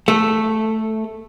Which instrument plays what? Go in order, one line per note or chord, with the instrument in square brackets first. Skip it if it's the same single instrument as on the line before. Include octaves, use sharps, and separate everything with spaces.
[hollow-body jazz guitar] A3